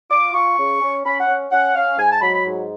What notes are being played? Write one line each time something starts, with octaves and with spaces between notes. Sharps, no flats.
F4 D6
F4 C#6
C#3
C#4
C#4 B5
F#5
C#4
C#4 F#5
C#4 F5
G#2 G#5
A5
F#3 B5
B5
G#2